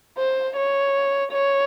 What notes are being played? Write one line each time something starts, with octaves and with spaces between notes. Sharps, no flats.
C5
C#5
C#5